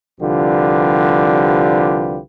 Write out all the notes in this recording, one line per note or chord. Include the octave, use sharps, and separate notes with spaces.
C2 D3 F3 F4 G4 B4